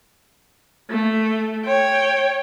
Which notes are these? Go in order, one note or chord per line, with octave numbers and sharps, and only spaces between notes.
A3
C#5 G5